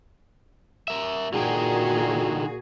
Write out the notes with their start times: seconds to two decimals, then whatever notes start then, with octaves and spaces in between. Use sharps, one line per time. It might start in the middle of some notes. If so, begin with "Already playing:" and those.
0.88 A#4 E5
1.34 A#2 D3 D#4 F#4 G#4 G5